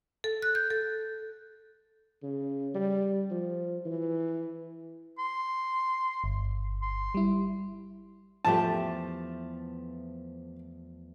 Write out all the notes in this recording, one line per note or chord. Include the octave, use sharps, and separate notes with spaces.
A4
F#6
G6
A4
C#3
G3
F3
E3
C6
G1
C6
G3 E4
E2 F3 A3 G4 A5